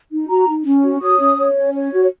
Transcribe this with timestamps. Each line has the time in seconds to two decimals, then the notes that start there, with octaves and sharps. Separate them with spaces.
0.11 D#4
0.29 F#4 A#5
0.48 D#4
0.66 C#4
0.84 F#4
1.02 C#5 D#6
1.20 C#4
1.38 C#5
1.57 C#4
1.75 C#5
1.93 F#4